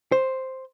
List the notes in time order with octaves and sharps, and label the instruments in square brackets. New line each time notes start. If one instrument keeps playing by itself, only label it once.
[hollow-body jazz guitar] C5